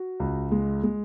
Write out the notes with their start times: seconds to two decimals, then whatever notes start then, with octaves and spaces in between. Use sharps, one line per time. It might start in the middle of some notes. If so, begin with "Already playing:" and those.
Already playing: F#4
0.20 C#2
0.52 G#3
0.83 G#3